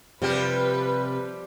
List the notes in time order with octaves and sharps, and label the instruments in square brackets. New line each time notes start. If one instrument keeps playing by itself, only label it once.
[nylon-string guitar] C3 [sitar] F3 G3 G4 [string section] B4